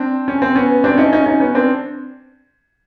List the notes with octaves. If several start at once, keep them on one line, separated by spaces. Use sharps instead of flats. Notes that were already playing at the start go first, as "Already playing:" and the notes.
Already playing: C4 D4
C#4
C4
B3 C#4
C4 D4
C#4 D#4
C#4 D#4
C#4 D#4
B3 C#4
C4 D4